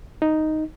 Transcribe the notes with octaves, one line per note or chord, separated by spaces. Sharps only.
D#4